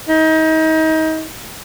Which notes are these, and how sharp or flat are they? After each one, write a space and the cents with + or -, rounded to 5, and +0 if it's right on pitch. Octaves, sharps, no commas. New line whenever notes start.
D#4 +30